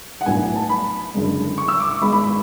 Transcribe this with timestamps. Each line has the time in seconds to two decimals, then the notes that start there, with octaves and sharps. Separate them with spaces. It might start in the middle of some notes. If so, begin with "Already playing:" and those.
0.21 F#5
0.26 B1 A2 F#3 B3 D4 G#5
0.56 A5
0.69 B5
1.14 F#1 F#2 D3 G#3
1.58 C#6
1.68 E6
1.80 D6
1.91 C#6
2.01 G#1 G#2 G#3 B3 B5
2.13 B5
2.24 B5